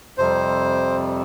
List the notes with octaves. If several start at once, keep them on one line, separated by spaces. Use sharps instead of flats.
F2 C3 G3 C5